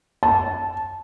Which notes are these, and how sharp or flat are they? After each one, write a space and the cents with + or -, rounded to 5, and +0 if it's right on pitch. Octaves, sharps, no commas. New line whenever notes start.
A5 -15